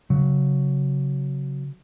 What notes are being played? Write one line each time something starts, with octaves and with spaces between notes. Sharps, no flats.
C#3 F#3